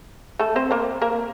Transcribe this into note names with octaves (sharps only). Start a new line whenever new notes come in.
A3 A4
C4 C5
A#3 A#4
A#3 A#4